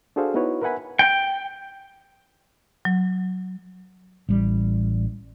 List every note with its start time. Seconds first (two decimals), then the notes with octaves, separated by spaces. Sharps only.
0.16 D4 F#4 G#4 A4 C5 F5
0.34 B3 D#4 E4 F#4 B4 C#5
0.62 A#4 B4 E5 F#5 G#5 B5
0.99 G5
2.85 F#3
4.29 A1 G3